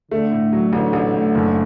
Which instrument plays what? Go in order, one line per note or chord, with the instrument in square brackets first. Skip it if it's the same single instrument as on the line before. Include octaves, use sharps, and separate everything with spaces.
[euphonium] D3 [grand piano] A3
[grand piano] A2
F#3
[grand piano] A1 [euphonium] D3
[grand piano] A1
A2
F#1